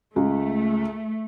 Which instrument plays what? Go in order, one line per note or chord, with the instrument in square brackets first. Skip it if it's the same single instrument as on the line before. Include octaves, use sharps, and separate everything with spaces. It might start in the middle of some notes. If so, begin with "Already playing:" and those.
[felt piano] C#2 [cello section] A3